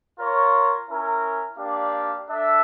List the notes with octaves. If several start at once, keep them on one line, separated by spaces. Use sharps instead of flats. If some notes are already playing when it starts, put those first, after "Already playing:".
F4 A#4 C#5
C#4 E4 A#4
A#3 D4 G4 D5 F5
D4 A4 E5